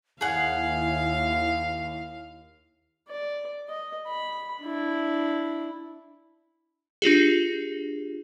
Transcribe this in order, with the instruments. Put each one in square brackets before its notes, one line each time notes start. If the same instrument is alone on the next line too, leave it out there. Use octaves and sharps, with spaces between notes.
[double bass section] D#2 [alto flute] E4 [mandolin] G#4 F#5 [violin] F5
[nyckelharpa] D5
D#5
B5
D4 E4
[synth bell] D4 F4 G4 G#4